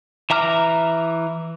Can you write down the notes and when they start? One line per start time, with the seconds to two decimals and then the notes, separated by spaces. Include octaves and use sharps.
0.30 E3 E5 A#5 D6 F6